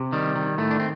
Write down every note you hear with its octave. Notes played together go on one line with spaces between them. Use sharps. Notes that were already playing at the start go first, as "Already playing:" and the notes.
Already playing: C3
D#3 G3
D#3
A2 A3
D4
C4